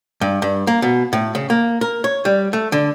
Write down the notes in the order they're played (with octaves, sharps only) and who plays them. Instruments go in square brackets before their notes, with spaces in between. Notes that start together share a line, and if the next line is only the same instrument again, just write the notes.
[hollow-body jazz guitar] G2
G2
A#3
B2
A2
C#3
A#3
A#4
C#5
G3
A3
D3